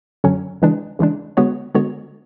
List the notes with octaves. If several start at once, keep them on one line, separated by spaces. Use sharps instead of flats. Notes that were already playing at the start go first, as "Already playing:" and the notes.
F#2 D3 F#3 C#4
C#3 E3 G#3 D4
C#3 E3 G#3 D4
D3 G#3 B3 F#4 C#5
D3 G#3 B3 F#4 C#5